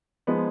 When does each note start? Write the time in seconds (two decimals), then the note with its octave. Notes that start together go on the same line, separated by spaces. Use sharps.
0.27 F3 G#3 B3 D#4